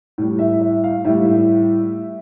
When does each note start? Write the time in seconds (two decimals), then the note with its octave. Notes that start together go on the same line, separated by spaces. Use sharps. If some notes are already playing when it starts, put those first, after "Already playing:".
0.18 A2 G3
0.39 E5
0.61 E5
0.84 F5
1.04 A2 G3 E5